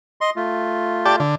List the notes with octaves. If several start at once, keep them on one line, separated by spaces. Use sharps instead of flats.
D#5 C6
A3 F4
G4 D5 A5
D3